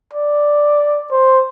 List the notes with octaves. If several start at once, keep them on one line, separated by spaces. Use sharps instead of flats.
D5
C5